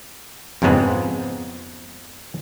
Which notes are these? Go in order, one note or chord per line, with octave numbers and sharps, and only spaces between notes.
F2 G#2 C#3 G#3 B3 C4